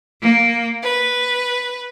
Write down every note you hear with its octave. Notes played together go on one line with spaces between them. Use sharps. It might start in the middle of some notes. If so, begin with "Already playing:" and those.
A#3
B4